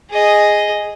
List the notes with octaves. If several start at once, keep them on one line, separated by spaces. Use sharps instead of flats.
G#4 D#5